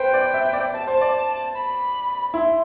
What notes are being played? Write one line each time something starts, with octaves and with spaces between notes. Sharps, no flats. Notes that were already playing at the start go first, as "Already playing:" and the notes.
Already playing: B4 C5 G5
D5
E5
D5
D5 A5
C5
D5
B5
E4 C6